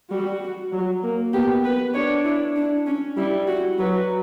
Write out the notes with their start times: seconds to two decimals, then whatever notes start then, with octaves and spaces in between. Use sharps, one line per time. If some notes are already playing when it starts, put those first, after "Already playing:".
0.11 G3 F#4
0.72 F#3
1.03 A#3
1.33 B3 G4
1.64 B4
1.94 D4 C#5
2.25 E4
2.56 D4
2.86 C#4
3.17 G3 E4
3.48 F#4
3.78 F#3 B4